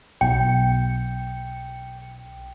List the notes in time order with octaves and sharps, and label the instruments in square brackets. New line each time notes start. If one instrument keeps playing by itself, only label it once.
[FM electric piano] B1 C#7 [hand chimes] G5